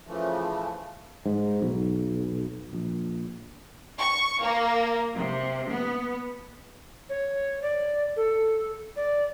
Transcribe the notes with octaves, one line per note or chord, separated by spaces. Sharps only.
C#3 E3 F3 A3
G#2
B1
A#1
C#6
A#3
C3
B3
C#5
D5
A4
D5